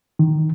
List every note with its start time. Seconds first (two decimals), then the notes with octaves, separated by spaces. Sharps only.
0.19 D#3